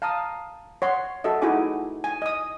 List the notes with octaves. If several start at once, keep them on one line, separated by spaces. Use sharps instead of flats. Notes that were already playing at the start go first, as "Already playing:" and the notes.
F5 A5 A#5 D#6
C#5 F#5 C6
F#4 A4 D#5 E5
D#4 E4 F#4 G#4 G#5 D6
G#5
D#5 D#6